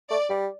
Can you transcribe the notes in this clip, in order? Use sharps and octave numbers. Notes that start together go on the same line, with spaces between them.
A3 D5
G3